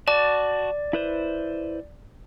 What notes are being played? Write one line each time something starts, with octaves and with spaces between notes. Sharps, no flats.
F#4 D5 A5 D6
E4 B4 C5